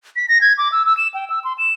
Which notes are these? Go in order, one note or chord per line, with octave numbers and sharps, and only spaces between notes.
B6
A#6
G#6
D6
E6
E6
E7
G5
E6
C6
E7